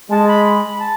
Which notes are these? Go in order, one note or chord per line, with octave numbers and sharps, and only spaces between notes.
G#3 A5
B5
B5
A5